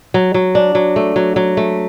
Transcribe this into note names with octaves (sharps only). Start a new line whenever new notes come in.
F#3
F#3
D4
F#3
A3
F#3
F#3
A3